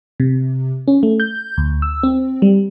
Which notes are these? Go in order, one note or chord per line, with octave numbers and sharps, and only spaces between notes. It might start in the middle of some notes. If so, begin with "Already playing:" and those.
C3
C#4
A3
G6
D2
E6
C4
G3